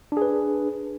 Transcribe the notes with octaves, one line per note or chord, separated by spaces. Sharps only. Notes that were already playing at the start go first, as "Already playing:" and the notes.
D4 G#4 B4